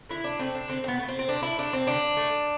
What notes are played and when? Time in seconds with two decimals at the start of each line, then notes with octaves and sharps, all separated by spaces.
0.09 D3 E4
0.24 D4
0.39 A3 C4
0.55 D4
0.68 D3 C4
0.84 C4
0.88 B3
0.99 A3
1.09 C4
1.19 C4
1.28 D3 D4
1.43 E4
1.58 A3 D4
1.73 C4
1.87 D3 D4
2.17 A3